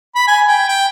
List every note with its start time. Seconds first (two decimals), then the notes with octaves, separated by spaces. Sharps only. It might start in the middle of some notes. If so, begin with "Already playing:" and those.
0.15 B5
0.27 G#5
0.47 G5
0.68 G5